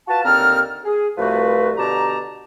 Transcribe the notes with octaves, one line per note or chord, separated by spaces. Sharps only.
F4 F#4 B4 A5
D#2 D3 C4 A4 A#5 F6
G#4
C2 F3 A3 F#4 B4
B2 D3 G4 A5 A#5